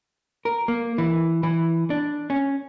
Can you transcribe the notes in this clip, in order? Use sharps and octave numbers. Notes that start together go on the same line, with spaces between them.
A#4
A#3
E3
E3
D4
C#4